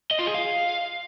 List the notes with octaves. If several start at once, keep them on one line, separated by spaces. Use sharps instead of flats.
D#5
F4
G#4
F5